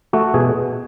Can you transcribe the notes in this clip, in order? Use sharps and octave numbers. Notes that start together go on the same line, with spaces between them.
A3 F#4
B2 G#4